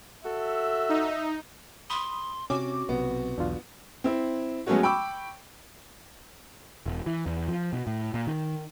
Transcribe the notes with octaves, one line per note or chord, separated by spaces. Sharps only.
F#4 A4 E5
D#4
B5 C6 D#6
C3 C#4 F#4 D6
B1 C3 B3
B1 E2 D4 F4
C4 E4
F#3 G#3 A3 B3 C#4 F#4
G5 B5 C#6 D6 E6
E1
E3
E2
F3
B2
A2
A#2
D#3